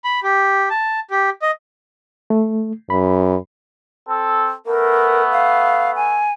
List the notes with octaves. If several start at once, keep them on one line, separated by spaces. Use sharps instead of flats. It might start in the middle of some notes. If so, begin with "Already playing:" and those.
B5
G4
A5
G4
D#5
A3
F#2 B5
C4 A4
A3 B3 A#4
F5
G#5